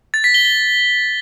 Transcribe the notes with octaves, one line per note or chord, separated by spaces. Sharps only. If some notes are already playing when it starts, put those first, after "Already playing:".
A6
B6
G7
G7